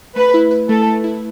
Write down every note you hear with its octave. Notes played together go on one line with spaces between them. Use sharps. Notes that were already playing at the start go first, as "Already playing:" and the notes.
A3 B4
E4
B4
A3 A4
A3
E4